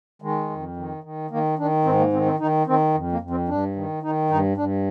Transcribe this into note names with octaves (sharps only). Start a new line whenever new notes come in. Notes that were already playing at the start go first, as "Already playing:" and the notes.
D#3 G#3
F2
D#3
D#3
D#3 A#3
D#3 D4
G#2 C4
A#3
D#3 C4
C4
D#3 D#4
D#3 C4
F2
A#3
F2
C4
G2 D4
D#3
D#3 D#4
G2 D#4
G2 D4